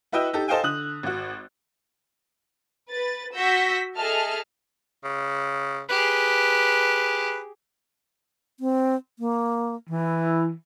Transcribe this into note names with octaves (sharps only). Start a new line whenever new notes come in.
E4 F#4 B4 D#5 G5 E6
D#4 G4 A4
A4 C5 D#5 F5 G5 G#5
D3 D#6 F#6 F#7
G#1 F#4
B4 A6
F#4 E6 G6 A#6 B6
G#4 A4 D#5 E5 A5 F6
C#3
G4 G#4 B4
C4
A#3
E3 E4